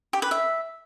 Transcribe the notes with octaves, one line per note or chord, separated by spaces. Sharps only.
G4
B4
E5